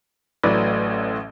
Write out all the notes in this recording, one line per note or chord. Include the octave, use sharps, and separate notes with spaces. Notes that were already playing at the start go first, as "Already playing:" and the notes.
A1 A2 F#3 B4 D5